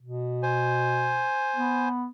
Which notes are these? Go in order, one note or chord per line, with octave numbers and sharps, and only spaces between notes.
B2
C5 G#5
B3